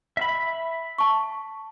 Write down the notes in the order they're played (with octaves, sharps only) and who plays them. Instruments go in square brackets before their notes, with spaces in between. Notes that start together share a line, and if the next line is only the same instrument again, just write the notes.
[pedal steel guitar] E5 B5
[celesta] A5 C#6